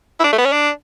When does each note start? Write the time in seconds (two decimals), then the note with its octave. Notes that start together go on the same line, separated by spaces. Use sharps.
0.20 E4
0.24 D4
0.33 A3
0.38 B3
0.46 C#4
0.53 D4